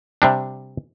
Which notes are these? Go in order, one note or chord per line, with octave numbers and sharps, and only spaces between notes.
C3 G3 D4